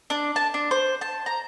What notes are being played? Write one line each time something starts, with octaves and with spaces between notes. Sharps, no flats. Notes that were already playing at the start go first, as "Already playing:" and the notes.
D4
A5
D4
C5
A5
A#5